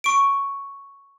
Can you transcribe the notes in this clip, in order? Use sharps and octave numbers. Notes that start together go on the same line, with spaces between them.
C#6 D7